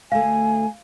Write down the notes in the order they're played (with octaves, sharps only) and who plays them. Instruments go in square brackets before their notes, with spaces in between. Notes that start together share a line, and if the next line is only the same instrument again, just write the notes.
[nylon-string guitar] D2 A3 [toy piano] F5 [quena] G#5